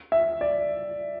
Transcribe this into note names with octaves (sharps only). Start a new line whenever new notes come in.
E5
D5